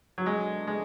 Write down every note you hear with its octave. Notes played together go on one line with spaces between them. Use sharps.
F#3
B2 G#3 A3 D4
G#3